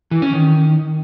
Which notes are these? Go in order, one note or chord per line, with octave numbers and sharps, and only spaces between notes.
E3
C#4
D#3